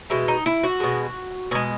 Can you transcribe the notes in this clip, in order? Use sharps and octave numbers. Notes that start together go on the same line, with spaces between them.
B2 G#3 E4
D#4
E4
F#4
B2 G#3
B2 G#3 G#4